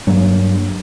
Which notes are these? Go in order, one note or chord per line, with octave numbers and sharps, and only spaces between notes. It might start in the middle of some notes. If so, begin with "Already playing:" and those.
G2 F#3 A#3